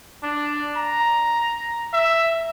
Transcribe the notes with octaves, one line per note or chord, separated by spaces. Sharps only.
D4
A#5
E5